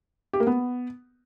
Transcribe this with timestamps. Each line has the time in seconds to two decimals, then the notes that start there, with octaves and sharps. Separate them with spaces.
0.33 G4
0.40 A#3
0.47 B3